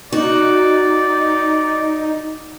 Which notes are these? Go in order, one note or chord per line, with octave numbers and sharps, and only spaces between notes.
D#4 F#4 D5